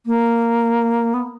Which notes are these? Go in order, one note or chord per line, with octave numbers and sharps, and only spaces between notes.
A#3
B3